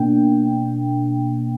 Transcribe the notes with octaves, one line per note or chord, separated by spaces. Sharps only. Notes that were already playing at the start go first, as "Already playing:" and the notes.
Already playing: B2 A#3 D4 G5